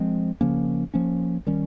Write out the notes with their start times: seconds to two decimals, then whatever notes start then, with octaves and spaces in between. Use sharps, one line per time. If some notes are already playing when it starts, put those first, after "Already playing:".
Already playing: F3 G#3 C4
0.41 C#3 F3 A#3 C#4
0.94 F3 A#3 C#4
1.47 D#3 G3 C#4